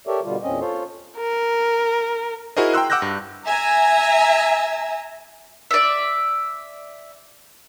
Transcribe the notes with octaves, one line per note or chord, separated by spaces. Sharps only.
G4 A4 A#4 C#5 D5 E5
B2 D3 G3 F4
E2 A#2 C4 C#4 D#5
F4 A4 C5 C#5
A#4
E4 F#4 G#4 A#4 C5 D#5
G5 A#5 C6 E6 F#6
F#5 D6 E6 F#6 G6 A#6
G2
E5 G#5 A#5
D5 E5